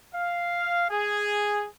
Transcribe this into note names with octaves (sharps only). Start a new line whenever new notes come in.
F5
G#4